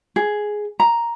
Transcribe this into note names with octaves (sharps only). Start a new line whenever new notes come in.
G#4
A#5